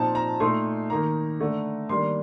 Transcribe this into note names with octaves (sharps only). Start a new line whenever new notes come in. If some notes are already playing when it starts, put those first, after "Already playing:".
Already playing: A#2 F3 C4 D#4 A5
A#5
A#2 A3 D#4 C6
D#3 A#3 D#4 A#5
D3 A3 D4
D#3 G3 A#3 D4 C6